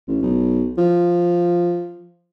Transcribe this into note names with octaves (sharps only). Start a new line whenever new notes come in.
A1
B1
F3